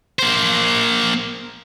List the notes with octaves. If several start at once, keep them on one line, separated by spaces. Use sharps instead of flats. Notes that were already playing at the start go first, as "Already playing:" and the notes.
A#3 C5